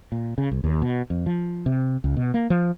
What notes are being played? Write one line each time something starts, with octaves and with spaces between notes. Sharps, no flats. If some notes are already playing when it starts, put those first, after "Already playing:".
A#2
C#3
C2
D#2
B2
F2
F3
C3
C#2
B2
A#3
F3